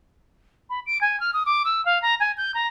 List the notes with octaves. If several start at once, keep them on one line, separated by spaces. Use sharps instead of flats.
B5
D7
G#5
F6
D#6
D6
E6
F5
A#5
G#5
G6
A#5